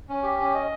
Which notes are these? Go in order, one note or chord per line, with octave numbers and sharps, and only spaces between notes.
C#4
G4
C#4
D#5